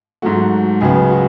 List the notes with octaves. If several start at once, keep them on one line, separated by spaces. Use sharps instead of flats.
G#2 F#3 A3 F#4
C#2 C#3 F#3 B3 G#4
F#4